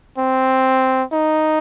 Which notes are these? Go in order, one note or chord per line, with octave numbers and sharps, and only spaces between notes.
C4
D#4